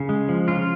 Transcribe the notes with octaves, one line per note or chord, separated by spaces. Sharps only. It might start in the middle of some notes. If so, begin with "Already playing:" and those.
Already playing: C#3
G#3
F3
C#3 F4